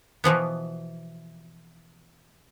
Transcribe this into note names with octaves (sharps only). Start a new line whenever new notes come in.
B2 E3 F3 B3